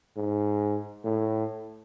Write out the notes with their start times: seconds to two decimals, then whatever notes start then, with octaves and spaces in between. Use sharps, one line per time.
0.17 G#2
1.04 A2